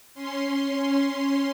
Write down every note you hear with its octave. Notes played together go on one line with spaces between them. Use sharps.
C#4 C6